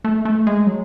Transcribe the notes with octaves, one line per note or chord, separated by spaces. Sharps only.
A3
A3
G#3
F#3